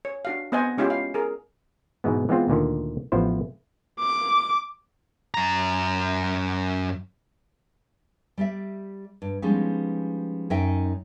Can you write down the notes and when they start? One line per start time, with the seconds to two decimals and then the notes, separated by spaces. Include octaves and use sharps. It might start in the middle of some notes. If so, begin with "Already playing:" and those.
0.05 C#5
0.25 D4 F#4 F5
0.52 B3 C4 C5 D#5 F#5 G#5
0.78 G#3 C#4 E4 F4 G4 G5
0.90 F5
1.14 G#4 A#4
2.04 G#2 B2 E3 G#3 B3
2.29 E3 G#3 B3 C4 F4
2.48 D2 A#2 D3 D#3
3.12 A1 F3 B3 E4 C5
4.00 D6
5.34 F#2 A#5
8.38 G3 G4 D5 E5
9.22 G2
9.42 F3 G3 G#3 B3 C#4 D#4
10.50 F#2 C#4 D#4 D#5 E5 G5